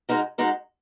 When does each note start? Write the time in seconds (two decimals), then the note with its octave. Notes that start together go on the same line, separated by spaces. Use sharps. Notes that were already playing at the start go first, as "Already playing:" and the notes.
0.09 G#3 D#4 F#4 A#4
0.38 G#3 D#4 F#4 A#4